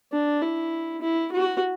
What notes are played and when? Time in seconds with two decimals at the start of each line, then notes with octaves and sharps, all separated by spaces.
0.12 D4
0.42 E4
1.02 E4
1.32 F#4